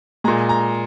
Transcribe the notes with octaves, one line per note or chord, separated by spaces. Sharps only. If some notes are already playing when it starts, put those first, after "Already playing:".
A#2 G#3 A#5
A#5